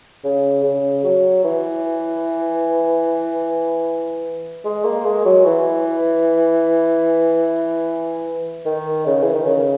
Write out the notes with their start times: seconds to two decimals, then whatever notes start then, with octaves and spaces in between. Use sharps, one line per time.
0.24 C#3
0.63 C#3
1.04 F#3
1.44 E3
4.65 G#3
4.85 A#3
5.05 G#3
5.25 F#3
5.45 E3
8.65 D#3
9.06 C#3
9.22 E3
9.34 D#3
9.46 C#3